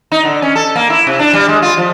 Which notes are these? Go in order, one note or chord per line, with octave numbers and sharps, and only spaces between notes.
D#4
D3
C#4
A4
A#3
E4
C3
D4
G3
G#3
F4
F3